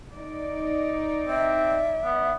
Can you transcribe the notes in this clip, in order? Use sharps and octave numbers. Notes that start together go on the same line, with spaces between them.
D#4 D5
C4 E5
B3